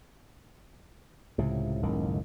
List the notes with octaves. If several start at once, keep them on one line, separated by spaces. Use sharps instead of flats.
C#2 A2 C3
F#1 C#2 A2 D#3